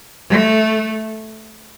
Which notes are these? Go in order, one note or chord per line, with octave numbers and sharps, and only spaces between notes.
A3